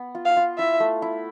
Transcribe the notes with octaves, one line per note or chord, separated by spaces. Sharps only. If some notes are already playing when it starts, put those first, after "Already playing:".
Already playing: B3
F4
F5
F4
E4 E5
A3
E4